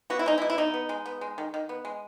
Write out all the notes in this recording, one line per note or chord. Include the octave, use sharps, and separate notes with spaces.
B3 F#4
E4
G#3 D#4
E4
B2
E4
B2 D#4
B3
G#3
B3
G#3
D#3
D#3
B3
G#3